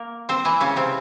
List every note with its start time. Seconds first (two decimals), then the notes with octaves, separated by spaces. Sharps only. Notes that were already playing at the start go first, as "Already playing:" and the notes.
Already playing: A#3 A#4
0.29 C4 C5
0.45 E3 E4
0.60 C#3 C#4
0.76 C3 C4